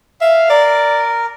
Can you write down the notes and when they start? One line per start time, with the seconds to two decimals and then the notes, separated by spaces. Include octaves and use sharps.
0.21 E5 F5
0.50 A#4 D5